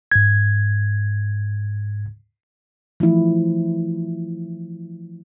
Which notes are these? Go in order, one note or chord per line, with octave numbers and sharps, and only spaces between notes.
G#2 G#6
E3 F3 A3 E4